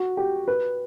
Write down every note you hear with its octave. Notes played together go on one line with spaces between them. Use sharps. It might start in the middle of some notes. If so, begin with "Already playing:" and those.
Already playing: F#4
G4
B4